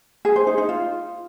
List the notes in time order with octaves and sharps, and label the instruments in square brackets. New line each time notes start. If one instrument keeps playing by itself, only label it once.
[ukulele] G#4
C5
D#4
D#4
F4